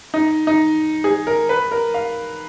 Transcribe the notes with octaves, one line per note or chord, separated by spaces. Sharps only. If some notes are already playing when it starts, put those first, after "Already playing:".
D#4
D#4
G#4
A#4
B4
A#4
F5